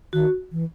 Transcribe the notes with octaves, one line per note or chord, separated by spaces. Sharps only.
D#3 F#4
E3